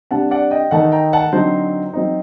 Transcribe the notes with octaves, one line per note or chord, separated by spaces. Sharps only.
C3 G3 D4 F#5 A5
D5 F#5
D#5 G5
D#3 A3 D#4 F#5 A5
G5 A#5
F#5 A5
D3 F#3 C4 D#4 C5
F#3 C4 D#4